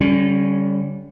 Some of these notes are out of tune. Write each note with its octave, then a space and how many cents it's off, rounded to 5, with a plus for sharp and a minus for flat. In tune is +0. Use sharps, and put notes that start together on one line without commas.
D3 -30 G3 +0 C#4 +0